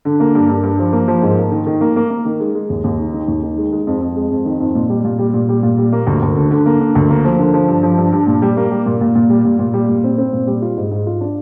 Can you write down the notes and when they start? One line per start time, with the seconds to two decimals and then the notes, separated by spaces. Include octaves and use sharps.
0.05 D3
0.20 A#3
0.35 G2
0.49 G2
0.63 G2
0.79 F3
0.93 A#3
1.08 F3
1.22 G#2
1.38 A#3
1.51 D#3
1.67 D#3
1.81 A#3
1.96 A#3
2.10 A#3
2.25 D#3
2.40 G#3
2.55 G#3
2.69 D#2
2.84 D#2
2.99 D#4
3.13 D#3
3.28 D#2
3.43 D#3
3.58 G#3
3.72 G#3
3.87 F2
4.02 F2
4.16 G#3
4.31 F2
4.45 D#3
4.60 F2
4.75 A#2
4.89 G3
5.05 A#2
5.19 G3
5.34 A#2
5.49 G3
5.63 A#2
5.78 G3
5.93 A#3
6.06 D2
6.22 D2
6.37 D3
6.51 D3
6.66 A#3
6.80 D3
6.95 D2
7.10 A#3
7.24 F3
7.39 D3
7.54 F3
7.68 G2
7.83 F3
7.98 G2
8.12 G2
8.27 A#2
8.42 G3
8.57 A#3
8.71 G3
8.86 A#2
9.01 A#2
9.15 A#2
9.30 G3
9.45 A#2
9.59 A#2
9.74 G3
9.89 A#2
10.04 C4
10.18 C4
10.32 A#2
10.47 G3
10.62 F4
10.77 G#2
10.91 G#2
11.07 F4
11.21 D4